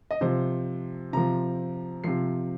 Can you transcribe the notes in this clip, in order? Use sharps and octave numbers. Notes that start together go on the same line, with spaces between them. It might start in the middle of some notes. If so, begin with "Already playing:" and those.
D#5
C3 F3 C5
C3 F3 A#5
C3 F3 C7